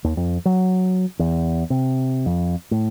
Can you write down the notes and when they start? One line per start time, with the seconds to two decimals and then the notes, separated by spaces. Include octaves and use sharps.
0.04 D#2
0.17 F2
0.45 F#3
1.19 E2
1.70 C3
2.26 F2
2.71 A2